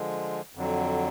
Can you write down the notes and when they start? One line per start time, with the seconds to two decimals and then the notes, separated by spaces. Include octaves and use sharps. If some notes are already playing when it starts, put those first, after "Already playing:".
Already playing: D3 F3 G#3
0.55 F2 D3 F#3